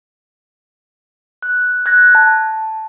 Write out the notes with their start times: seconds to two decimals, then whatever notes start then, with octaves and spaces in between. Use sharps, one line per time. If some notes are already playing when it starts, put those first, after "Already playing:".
1.42 F#6
1.86 F#6 G#6 A#6
2.15 A5